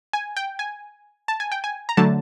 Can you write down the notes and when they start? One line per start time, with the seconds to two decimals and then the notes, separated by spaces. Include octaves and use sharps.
0.13 G#5
0.37 G5
0.59 G#5
1.28 A5
1.40 G#5
1.52 G5
1.64 G#5
1.89 A#5
1.97 D3 F#3 A3 A5